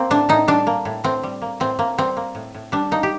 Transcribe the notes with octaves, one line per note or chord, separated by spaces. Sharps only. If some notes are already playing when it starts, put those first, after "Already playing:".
Already playing: A#3 C4
A2 D4
A2 D#4
G3 D4
A#3
A2
A2 C4
G3
A#3
A2 C4
A2 A#3
G3 C4
A#3
A2
A2
G3 D4
A#3 D#4
G4